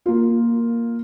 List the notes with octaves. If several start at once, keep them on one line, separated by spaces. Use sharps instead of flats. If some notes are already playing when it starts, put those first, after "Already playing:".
A#3 F4